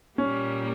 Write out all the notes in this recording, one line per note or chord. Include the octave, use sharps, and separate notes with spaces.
A#2 G3 A#3 C#4